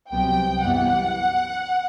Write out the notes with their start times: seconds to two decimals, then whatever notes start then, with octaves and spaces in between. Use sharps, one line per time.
0.11 C2 C3 F#3 B3 G5
0.63 F#2 E3 G3 B3 F#5